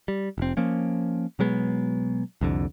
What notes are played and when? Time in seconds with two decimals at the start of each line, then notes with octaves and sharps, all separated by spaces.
0.08 G3
0.38 F1 C4
0.57 F3 A#3 C#4
1.39 B2 F#3 G#3 B3
2.41 C2 F2 D3